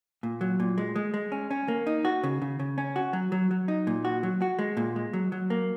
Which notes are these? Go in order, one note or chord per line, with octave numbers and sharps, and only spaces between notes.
A#2
F#3
A#2
G#3
G#3
G#3
C#4
C#4
A#3
D#4
F#4
C#3
C#3
C#3
C#4
F#4
F#3
F#3
F#3
D#4
A#2
F#4
F#3
F#4
G#3
A#2
G#3
F#3
F#3
A#3